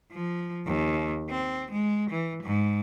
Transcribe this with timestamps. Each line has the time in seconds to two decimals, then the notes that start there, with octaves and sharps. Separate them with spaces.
0.12 F3
0.66 D#2
1.30 C4
1.72 G#3
2.11 E3
2.43 G#2